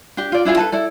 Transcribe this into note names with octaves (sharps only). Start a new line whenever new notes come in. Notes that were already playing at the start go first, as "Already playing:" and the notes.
D4 G4
F4 D5
D4 E4 F4 G#4
A4 B4 A5
E4 A4 D5